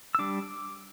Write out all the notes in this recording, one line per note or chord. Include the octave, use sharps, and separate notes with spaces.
E6
G3 D4 D6